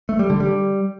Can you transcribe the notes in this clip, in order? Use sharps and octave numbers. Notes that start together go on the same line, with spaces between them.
A3
G3
D3
G3